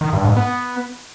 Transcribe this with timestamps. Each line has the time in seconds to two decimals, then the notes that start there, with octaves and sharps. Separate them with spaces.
0.01 D#3
0.13 G2
0.25 G#2
0.37 B3